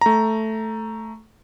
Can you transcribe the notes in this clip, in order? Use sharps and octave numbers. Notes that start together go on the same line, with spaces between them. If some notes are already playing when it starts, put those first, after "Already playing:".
A3 A#5